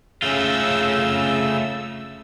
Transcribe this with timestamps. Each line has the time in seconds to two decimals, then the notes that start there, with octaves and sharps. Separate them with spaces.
0.22 C#3 A3 F4 E6